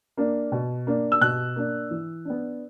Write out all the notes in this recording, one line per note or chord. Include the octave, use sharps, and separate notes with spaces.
A#3 D4
B2
A#3 D4
E6
B2 F#6
A#3 D4
E3
B3 D4